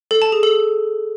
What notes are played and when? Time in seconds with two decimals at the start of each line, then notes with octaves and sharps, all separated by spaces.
0.11 A4
0.22 A5
0.32 G#4
0.43 A4